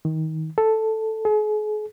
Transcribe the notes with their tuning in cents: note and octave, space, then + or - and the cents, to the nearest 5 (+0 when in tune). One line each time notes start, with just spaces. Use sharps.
D#3 +25
A4 +0
G#4 +40